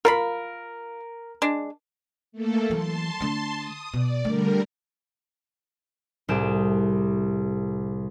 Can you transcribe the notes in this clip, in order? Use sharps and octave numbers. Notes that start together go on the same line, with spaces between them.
F4 A#4 F5 B5
G#3 D4
A3 A#3 A4
E3 F#3 A5 C6
D3 A3
D#6
B2 D5
D3 G3 A3 A#4
C2 A2 G4 G#4 G6 E7